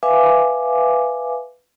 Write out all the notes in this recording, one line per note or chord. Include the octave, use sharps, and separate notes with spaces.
B4 E5 F5 G#5 D6